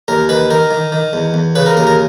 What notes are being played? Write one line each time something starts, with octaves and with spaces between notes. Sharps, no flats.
D#2 A#4
D#3 B4
D#3 A#4
D#3
D#3
E2
E2
C#3 B4
A#4
D#2 A#4
A#4